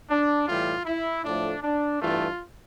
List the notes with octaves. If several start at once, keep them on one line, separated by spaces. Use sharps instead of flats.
D4
A2 E3 G3 F4
E4
A2 F3 A3 D4
D4
G2 E3 A3 F4